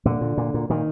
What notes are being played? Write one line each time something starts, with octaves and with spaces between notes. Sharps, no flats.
A#2 D3
A#2
A#2
A#2
A#2 D#3